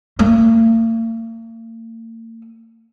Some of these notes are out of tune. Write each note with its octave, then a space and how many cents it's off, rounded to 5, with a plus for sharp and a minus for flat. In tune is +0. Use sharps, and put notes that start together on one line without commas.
A#3 -45